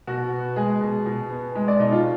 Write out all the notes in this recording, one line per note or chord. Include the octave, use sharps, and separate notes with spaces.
B2 F#4
B3
G#3 G#4
B2
B2
B3
G#3
D5
B2 D#4
F4